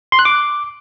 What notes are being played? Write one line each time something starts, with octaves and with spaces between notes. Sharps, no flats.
C6
F#6
D6